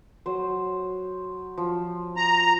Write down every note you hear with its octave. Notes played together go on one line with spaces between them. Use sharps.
F#3 C5
F3
A#5